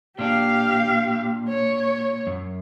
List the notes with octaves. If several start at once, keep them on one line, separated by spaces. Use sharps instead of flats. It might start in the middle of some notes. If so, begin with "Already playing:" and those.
A#2 D4 G4 F5
C#5
F#2